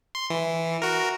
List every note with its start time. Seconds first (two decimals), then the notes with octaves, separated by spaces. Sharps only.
0.15 C6
0.30 E3
0.82 F#4 A#4